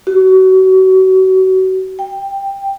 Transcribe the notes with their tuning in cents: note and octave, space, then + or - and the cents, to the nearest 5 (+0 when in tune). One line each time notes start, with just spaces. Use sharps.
F#4 +30
G5 +0